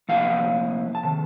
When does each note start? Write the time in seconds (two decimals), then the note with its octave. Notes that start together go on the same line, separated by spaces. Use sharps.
0.09 C3 F3 A#3 F5
0.95 A5
1.03 C3 D#3